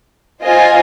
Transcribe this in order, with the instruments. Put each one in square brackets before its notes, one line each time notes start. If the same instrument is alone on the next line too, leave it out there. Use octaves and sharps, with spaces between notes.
[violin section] F4 C5 D#5 G#5